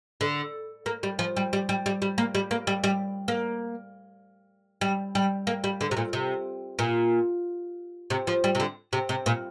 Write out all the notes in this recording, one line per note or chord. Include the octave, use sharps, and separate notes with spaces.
D3
A#3
G3
F3
G3
G3
G3
G3
G3
A#3
G3
A#3
G3
G3
A#3
G3
G3
A#3
G3
D3
C3
A#2
C3
A#2
C3
F3
G3
C3
D3
C3
C3
A#2